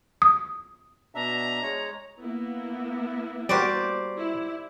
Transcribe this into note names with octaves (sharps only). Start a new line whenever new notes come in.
D#6
B2 D4 E5 A#5
G#3 C#5
A#3 B3 E4
G3 F#4 G4 A#4 C5 D5
E4